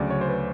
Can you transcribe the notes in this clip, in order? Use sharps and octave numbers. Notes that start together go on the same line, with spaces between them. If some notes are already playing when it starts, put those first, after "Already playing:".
Already playing: D2 C#3 F#3 D5
C#5
C5
B4